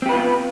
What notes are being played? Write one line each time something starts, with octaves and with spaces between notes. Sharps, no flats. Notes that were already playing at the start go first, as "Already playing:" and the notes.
B3 C4 F4 G4 B4